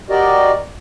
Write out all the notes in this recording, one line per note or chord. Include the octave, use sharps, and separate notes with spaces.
F#4 G4 A#4 D5 D#5